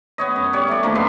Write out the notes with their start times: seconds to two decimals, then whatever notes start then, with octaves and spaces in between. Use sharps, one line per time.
0.18 B3 C#5 D#5
0.36 F#2
0.53 G3 C#5
0.68 A3 D5
0.83 D#3 F3 A#3 D4
0.95 F#2 B3 B4 C6